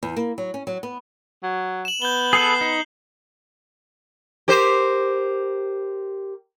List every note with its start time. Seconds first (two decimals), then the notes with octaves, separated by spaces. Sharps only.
0.03 E2
0.16 A#3
0.38 F#3
0.54 C#4
0.67 F#3
0.83 B3
1.43 F#3
1.85 E7 F#7
2.02 B3 G6 G7
2.33 G#4 A4 B4 C7
2.61 D#4
4.48 G4 A#4 C5